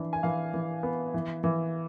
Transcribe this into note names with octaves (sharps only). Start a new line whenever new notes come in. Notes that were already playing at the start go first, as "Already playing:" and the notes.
Already playing: E3 D4
G#5
E3 F5
E3
B3
E3
E3